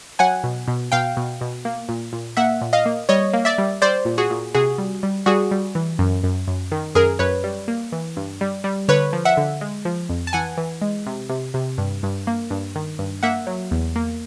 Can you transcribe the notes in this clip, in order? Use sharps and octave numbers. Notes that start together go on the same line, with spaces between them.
F#3 F#5 G#5
B2
B2
B2 F5 G5
B2
B2
A#3
A#2
A#2
A#3 E5 F#5
A#2
D#5 F5
A#3
G3 C#5 D#5
A#3
D5 E5
G3
G3 C5 D5
A#2
F#4 G#4
A#2
C3 F#4 G#4
G3
G3
G3 F#4 G#4
G3
E3
F#2
F#2
F#2
D#3
F#2 G#4 A#4
F#2 B4 C#5
G3
A#3
E3
G2
G3
G3
D3 B4 C#5
F3
E5 F#5
D3
G#3
F3
F2
A5
E3 F#5 G#5
E3
G#3
C3
C3
C3
G2
G2
A#3
G2
D#3
G2
A#3 E5 F#5
F#3
E2
A#3